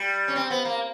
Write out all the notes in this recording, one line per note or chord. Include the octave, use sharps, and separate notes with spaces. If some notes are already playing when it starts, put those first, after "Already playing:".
Already playing: G3
C#4
C4
B3
A#3